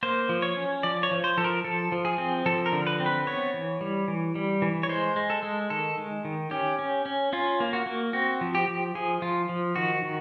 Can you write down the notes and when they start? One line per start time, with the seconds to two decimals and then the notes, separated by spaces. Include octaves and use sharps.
0.03 A#3 C5
0.29 F3
0.42 C#5
0.57 C#4
0.83 F3 D5
1.03 C#5
1.11 F3
1.24 C5
1.37 F3 A4
1.44 A#4
1.64 F3 A4
1.92 F3
2.05 G#4
2.18 C4
2.46 F3 A4
2.66 A#4
2.72 D3
2.87 B4
3.00 C4
3.06 B4
3.27 B3 C#5
3.54 E3
3.81 G3
4.08 E3
4.35 G3
4.62 E3
4.83 C#5
4.89 G#3 C5
5.16 G#3
5.30 A4
5.43 G#3
5.70 D#3 A4
5.98 G#3
6.25 D#3
6.51 C#4 G4
6.79 C#4
7.06 C#4
7.33 C#4 F4
7.60 A#3
7.73 F#4
7.86 A#3
8.13 C4 F#4
8.41 F3
8.55 G4
8.68 F3
8.95 F3 G#4
9.22 F3 F4
9.49 F3
9.76 D#3 F#4
10.03 D#3